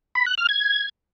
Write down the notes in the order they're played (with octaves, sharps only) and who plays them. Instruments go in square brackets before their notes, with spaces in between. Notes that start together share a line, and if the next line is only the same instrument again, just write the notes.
[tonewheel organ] B5
F#6
F6
G#6